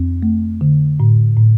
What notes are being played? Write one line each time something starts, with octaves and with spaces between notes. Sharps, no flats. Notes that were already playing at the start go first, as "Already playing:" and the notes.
Already playing: F2 C4
A3
D3
A2
A2